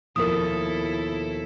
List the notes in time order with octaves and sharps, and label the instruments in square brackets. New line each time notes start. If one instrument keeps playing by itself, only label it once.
[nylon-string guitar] D#2 B2 F3 [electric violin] E4 A4 [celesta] A#4 D#6